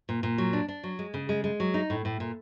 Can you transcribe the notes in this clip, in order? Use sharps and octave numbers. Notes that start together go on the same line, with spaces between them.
A#2
A#2
F#3
D4
D4
F#3
G#3
C#3
G#3
G#3
F#3
D#4
A2
A2
A#2